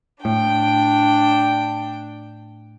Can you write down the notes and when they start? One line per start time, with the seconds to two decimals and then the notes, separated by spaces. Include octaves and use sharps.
0.25 A2 D4 G5